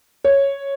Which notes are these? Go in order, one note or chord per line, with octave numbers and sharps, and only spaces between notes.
C#5